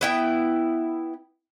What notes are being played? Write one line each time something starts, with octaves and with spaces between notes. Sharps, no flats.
B3 E4 G5